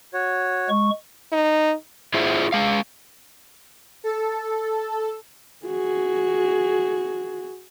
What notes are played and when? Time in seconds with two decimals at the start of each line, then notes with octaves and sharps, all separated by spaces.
0.14 F#4 C#5
0.69 G#3 C#6
1.32 D#4
2.14 E4 F4 G#4 C5 E5
2.52 G#3 F5
4.04 A4
5.66 F#4 G#4